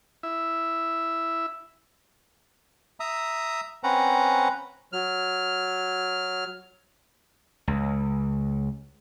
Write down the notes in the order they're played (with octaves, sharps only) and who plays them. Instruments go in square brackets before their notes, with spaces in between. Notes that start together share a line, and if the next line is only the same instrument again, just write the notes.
[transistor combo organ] E4 E5
[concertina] E5 A#5 D#6
C4 C#4 B4 F#5 A#5
[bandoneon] F#3 F6
[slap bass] C#2